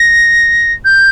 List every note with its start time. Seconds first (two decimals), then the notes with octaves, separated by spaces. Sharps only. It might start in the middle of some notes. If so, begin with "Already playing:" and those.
Already playing: A#6
0.85 G6